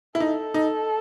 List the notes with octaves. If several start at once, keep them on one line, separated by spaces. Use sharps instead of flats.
E4
D#4 A4
D#4